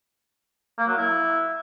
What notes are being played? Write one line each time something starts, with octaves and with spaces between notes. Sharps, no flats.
A#3
F#3
E4